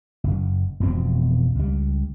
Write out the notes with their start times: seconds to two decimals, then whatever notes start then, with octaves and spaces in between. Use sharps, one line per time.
0.24 F#1
0.80 E1 F2 B2 C4
1.55 C#2 G3